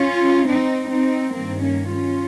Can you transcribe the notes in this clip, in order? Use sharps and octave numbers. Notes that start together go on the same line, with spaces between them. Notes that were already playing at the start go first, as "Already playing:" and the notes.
Already playing: C#4 F4
C4 D#4
C4 D#4
G2 D#3 A#3 C4
A#3 C#4
C#4 F4